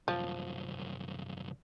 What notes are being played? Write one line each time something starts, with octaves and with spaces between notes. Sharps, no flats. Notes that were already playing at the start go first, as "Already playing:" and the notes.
C2 F#2 F3